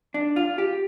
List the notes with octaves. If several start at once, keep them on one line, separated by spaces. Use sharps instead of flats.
D4
F4
G4